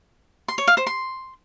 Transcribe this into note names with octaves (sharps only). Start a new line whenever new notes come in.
C6
C#5
F5
C5
C6